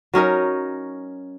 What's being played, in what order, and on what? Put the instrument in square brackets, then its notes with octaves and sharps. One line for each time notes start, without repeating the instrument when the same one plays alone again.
[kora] F#3 C#4 D#4 A#4